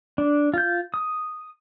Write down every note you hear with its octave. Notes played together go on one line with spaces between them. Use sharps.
D4
F4 G6
D#6